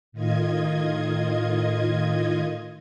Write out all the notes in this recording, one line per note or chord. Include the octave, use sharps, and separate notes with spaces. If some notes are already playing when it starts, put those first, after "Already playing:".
A2 D#3 F4 D#5 G#6